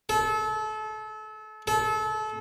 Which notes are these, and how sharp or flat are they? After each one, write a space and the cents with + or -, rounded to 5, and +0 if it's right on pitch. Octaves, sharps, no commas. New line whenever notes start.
A4 -30
A4 -30